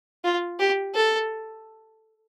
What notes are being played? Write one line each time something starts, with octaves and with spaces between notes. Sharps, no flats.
F4
G4
A4